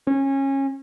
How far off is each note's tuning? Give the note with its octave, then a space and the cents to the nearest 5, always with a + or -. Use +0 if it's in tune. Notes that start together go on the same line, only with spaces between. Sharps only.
C#4 -25